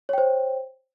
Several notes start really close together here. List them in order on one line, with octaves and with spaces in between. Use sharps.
C#5 G5 C5